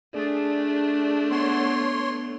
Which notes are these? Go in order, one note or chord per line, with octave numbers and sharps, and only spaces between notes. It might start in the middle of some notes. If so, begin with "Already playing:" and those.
A3 D4 G#4 D5
B3 C#5 C6